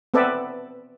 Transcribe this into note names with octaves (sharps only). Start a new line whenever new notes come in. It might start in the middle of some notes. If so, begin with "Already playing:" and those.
B3 C4 A4 B4 D5 E5